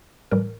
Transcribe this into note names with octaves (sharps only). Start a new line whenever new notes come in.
A2 E3 G3 A#4